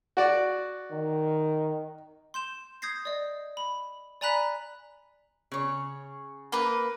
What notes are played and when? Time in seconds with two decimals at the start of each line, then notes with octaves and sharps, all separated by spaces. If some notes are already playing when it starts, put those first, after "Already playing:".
0.17 F#4 D5
0.91 D#3
2.34 C6 G6 E7
2.82 D#6 G6 G#6 A#6 C7
3.05 D5 D#5
3.57 B5
4.21 D5 G#5 A#5 B5 F#6 B6
5.52 C#3 C#5
6.52 A#3 B4